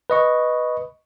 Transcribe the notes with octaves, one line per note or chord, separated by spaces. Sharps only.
B4 D#5 C#6